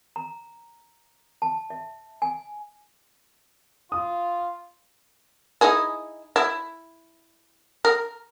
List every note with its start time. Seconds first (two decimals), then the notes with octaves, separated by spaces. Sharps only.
0.16 A#5
1.42 A5
1.70 E5
2.22 G#5
3.92 F4 D#6
5.61 D#4 E4 G#4
6.36 E4
7.85 A#4